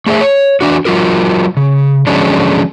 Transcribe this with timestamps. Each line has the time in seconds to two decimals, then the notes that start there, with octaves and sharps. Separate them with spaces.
0.07 A3 G#4 C5 E5
0.21 C#5
0.61 E3 D4 F#4
0.85 F#3 F4 F#4 A#4
1.57 C#3
2.07 D3 F3 F#3 G#3 C#4 D4